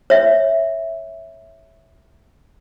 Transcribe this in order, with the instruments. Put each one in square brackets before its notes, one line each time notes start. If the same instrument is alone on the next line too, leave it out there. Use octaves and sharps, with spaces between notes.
[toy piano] C#5 E5